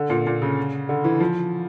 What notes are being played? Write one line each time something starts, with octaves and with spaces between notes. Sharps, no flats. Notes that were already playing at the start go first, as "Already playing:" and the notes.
Already playing: D3
A#2
A#2
C#3
D3
E3
F3